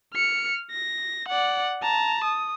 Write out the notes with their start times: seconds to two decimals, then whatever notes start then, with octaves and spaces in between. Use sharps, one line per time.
0.14 F6 C#7
0.71 A#6
1.29 D5 F#5
1.82 A5 A#5
2.25 D#6